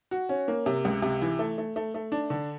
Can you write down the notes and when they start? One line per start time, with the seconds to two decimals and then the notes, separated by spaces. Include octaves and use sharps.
0.11 F#4
0.29 C#4
0.48 A#3
0.66 C3
0.85 C#2
1.02 C3
1.21 E3
1.39 A3
1.58 A3
1.76 A3
1.94 A3
2.12 D4
2.30 D3